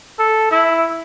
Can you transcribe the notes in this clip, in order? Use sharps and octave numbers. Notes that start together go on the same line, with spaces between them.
A4
E4